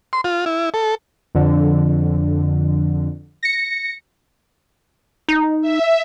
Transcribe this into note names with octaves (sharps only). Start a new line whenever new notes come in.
C6
F4
E4
A4
F2 D3
A#6 C#7
D#4
E5